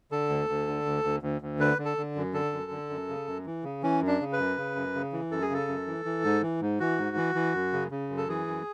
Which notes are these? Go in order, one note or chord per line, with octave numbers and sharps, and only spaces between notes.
D3 A4
D2
D2
D3
D2
D2
D2
D2
D3 B4
D3
A4
D3
F#2
D3 A4
F#2
D3
F#2
C#3
F#2
E3
C#3
E3 C#4
F#2
D4
C#3
B4
F#2
C#3
F#2
C#3
E3
F#2 A4
G#4
C#3 A4
F#2
E3
E3
G#2
E3
G#2
E3 F#4
G#2
E3
E3
F#2
C#3
C#3
F#2
A4
E3 G#4
F#2